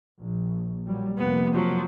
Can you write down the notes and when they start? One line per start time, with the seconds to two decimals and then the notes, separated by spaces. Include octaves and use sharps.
0.20 A#1
0.86 A#2 F#3 G3
1.18 F1 C3 A#3 B3
1.53 F3 F#3